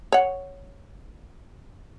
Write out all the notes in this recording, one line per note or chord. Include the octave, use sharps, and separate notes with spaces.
C#5 F#5